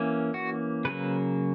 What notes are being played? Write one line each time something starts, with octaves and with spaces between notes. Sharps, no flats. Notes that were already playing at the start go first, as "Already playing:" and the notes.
Already playing: E3 A#3 C#4
F#4
C#3 F#3 A#3 B4